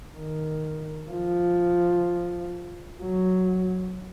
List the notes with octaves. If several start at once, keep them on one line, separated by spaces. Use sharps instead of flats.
D#3
F3
F#3